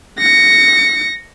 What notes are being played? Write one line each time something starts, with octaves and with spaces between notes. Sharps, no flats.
A#6 C#7